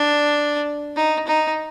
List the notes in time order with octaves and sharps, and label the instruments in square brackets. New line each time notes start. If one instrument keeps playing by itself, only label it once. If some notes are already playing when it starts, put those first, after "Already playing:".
Already playing: [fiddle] D4
D#4
D#4